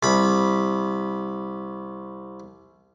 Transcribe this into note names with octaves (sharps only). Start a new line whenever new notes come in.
C2 B5